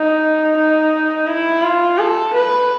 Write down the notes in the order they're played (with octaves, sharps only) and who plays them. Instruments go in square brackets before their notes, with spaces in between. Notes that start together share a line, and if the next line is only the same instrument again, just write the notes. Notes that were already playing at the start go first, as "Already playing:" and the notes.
Already playing: [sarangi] D#4
D#4
E4
F4
A4
B4